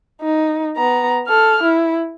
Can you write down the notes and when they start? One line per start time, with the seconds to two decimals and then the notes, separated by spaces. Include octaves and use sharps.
0.22 D#4
0.77 B3 A#5
1.27 A4 F6
1.63 E4